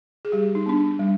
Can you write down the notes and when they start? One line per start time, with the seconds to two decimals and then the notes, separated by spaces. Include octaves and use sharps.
0.25 G#4
0.32 G3 G4
0.55 D#4
0.66 B3 D4
0.99 G3